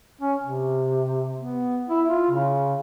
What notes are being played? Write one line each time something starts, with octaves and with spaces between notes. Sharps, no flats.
C#4
C3
B3
E4
F4
C#3